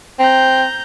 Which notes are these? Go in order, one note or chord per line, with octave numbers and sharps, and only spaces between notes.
C4 A#5 G6